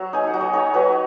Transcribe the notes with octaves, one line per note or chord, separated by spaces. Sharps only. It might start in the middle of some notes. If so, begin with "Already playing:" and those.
Already playing: F#3 C#5
D#4 G#5
F#5
F#3
D#5
D#4 C#5
F#3 B4